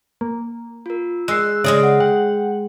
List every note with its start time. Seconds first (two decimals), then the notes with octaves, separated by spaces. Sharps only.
0.21 A#3
0.86 F4 A#4
1.28 G#3 E6 F#6 C7
1.64 C#3 G#3 G#4 D5 E5 D#6 F6
1.83 F#5
2.00 F#5 G5